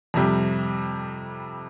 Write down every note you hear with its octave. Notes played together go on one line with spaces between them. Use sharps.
F2 C3 G3